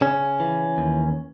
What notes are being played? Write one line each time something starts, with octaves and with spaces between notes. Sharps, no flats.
C#3 C#4
E3
D#2